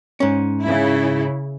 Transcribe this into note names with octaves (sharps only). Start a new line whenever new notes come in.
G#2 C#4
C#3 E4